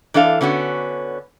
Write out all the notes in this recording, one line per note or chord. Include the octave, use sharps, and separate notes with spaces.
E3 D4 A4 F5
D3 B3 C#4 F#4